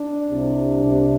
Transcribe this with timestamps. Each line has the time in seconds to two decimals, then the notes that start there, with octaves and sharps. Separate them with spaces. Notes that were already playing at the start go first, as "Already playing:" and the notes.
Already playing: D4
0.30 C2 C3
0.83 C2 C3